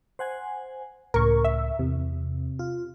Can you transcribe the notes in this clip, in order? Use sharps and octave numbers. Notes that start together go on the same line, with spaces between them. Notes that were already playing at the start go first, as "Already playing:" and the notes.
C5 F#5 G#5
C#2 A2 A#4 C#6
E5
E2 C3
F4